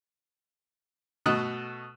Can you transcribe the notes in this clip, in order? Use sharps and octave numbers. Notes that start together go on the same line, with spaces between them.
B2 A3 D#5 F#6